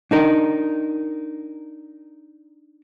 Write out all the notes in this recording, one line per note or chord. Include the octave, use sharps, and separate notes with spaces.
D4 D#4 A#4